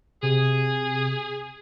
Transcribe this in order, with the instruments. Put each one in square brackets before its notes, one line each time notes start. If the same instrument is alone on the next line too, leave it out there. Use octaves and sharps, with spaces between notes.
[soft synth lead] C3 [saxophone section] G#4